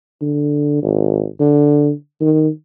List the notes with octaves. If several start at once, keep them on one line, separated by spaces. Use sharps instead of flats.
D3
G#1
D3
D#3